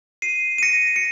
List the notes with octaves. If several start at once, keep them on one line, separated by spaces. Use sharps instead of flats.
C7 D#7
D#7
A#6 C#7
C#7